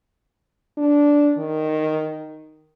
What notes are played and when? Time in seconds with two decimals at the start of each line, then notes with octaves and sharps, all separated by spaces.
0.78 D4
1.38 D#3